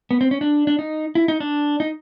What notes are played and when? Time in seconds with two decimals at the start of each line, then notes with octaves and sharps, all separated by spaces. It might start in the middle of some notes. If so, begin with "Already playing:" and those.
0.11 B3
0.21 C4
0.31 C#4
0.41 D4
0.67 D4
0.79 D#4
1.15 E4
1.28 D#4
1.40 D4
1.80 D#4